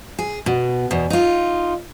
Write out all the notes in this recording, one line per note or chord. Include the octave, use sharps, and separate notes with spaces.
G#4
B2
E2 B2
D#4 F4